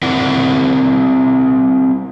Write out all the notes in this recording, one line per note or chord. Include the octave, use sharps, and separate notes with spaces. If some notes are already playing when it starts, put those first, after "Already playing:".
C4 E4 A#4 D5 F#5